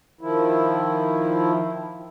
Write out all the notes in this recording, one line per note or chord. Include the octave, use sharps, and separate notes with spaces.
D#3 F3 E4